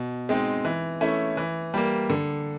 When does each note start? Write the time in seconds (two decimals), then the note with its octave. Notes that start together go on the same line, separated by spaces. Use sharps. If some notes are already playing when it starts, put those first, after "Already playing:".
Already playing: B2
0.29 G#3 C4 D#4
0.65 E3
1.01 A3 C#4 E4
1.37 E3
1.74 G3 A#3
2.10 D3